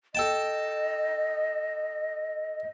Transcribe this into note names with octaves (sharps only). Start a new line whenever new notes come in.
A4 D#5 G5 A5